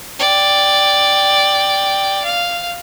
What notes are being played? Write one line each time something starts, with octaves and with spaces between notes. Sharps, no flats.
D5 G5
F5